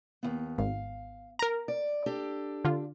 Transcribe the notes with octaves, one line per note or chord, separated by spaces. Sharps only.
D#2 B3
G#1 F5
A#4 A#5
D5
D4 G4 A4
D3 F4